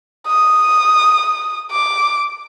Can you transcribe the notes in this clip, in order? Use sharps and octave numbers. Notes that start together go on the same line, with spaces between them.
D#6
D6